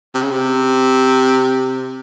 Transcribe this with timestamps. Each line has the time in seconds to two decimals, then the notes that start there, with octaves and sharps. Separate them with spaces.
0.15 C3
0.22 C#3
0.31 C3